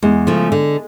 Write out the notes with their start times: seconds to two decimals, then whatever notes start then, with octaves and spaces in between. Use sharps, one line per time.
0.02 E2 G#3
0.27 C#3 F3 A3
0.52 D3